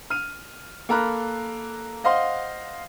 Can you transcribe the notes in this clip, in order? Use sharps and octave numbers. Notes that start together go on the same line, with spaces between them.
F6 D#7
A#3 A4 A#5 B5 F6 F#6
C5 D#5 F5 F#5 C6